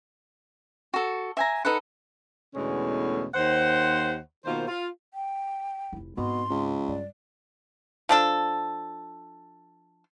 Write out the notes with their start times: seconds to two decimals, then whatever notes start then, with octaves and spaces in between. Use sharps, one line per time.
0.94 F#4 A4
1.37 E5 G#5 A#5
1.65 D#4 A4 B4 F#5
2.55 E2 B2 D3 G#3 A3 C#4
3.35 D#2 C5 F#5
4.45 B2 D#3 A#3 F4 C5
4.68 F4
5.14 G5
5.93 F1 E4
6.17 G#2 B2 C4 C6
6.50 C#2
6.88 G2 D5
8.09 F3 D4 A4